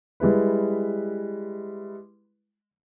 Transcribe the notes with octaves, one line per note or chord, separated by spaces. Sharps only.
G3 G#3 E4 B4